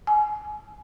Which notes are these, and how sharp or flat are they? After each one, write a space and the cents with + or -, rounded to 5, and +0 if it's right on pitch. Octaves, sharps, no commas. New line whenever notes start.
G#5 +25